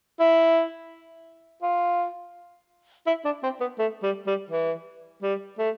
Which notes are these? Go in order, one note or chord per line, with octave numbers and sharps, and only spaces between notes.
E4
F4
E4
D4
C4
B3
A3
G3
G3
E3
G3
A3